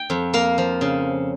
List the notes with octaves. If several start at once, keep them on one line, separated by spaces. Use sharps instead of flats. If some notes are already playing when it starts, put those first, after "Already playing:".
Already playing: G5
F2
A#3 F5
F3
C#3